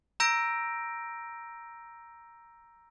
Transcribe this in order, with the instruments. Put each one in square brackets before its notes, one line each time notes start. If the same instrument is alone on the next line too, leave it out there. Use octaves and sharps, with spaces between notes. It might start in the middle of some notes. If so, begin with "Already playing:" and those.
[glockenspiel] A#5 E6 G6 A#6 D7